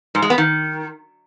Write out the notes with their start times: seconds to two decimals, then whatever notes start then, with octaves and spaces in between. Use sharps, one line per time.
0.15 G#2
0.22 G#3
0.30 B3
0.38 D#3